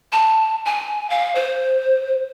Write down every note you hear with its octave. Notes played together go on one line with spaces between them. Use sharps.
A5
G#5
F5
C5